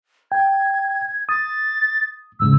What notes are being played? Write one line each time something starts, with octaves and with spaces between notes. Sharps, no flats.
G5 G#6
D#6 A6
E2 G#2 C#3 E6